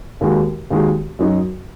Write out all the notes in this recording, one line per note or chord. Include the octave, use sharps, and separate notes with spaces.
D#2 D#3 G#3 F#4
D#2 D#3 G#3 F#4
F#2 F#3 D#4 F#4